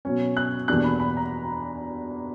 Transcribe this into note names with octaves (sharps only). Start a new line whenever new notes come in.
B2 F#3 C#4
F#6
E2 B2 G3 A#3 D4 F#6
B5
B5
A#5